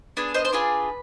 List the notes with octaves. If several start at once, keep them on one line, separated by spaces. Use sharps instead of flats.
B3 D4 G#4
C5 D#5
C5
D4 F4 G#4 B4